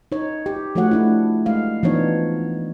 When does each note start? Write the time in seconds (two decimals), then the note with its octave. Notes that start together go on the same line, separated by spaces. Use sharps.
0.12 D#4 C#5
0.46 G4
0.75 F3 A3 F#4 C#5 F#5
0.91 A3 D4 E4
1.46 G#3 F5
1.83 E3 F3 B3 D4 D#4 C#5